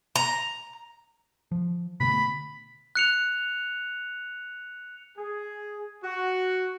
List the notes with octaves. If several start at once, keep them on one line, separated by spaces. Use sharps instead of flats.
A#5
F3
B2 D3 A3 B5
F#6 C#7 F7
G#4
F#4